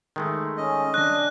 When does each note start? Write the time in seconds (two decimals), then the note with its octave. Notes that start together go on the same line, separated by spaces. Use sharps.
0.16 D#3 G#3 A3
0.57 C#4 D#5
0.94 D4 F#6 A#6